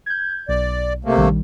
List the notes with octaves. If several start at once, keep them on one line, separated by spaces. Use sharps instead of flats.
G6 G#6
B1 D5
C3 A3 A#3
A#1 D#3 G3